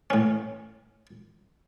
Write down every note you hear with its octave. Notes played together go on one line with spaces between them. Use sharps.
A2 C#4